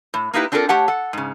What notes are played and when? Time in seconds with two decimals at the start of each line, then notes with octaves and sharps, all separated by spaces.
0.14 A2
0.33 A#3 D#4 E4 G4 B4
0.52 C4 D4 F4 G4 A4 A#4
0.69 A3 G4 C#5 F#5 A5
0.88 A4 F#5
1.13 G#2 C#3